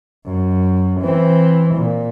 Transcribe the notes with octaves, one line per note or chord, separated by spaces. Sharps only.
F#2
E3 C4
A#2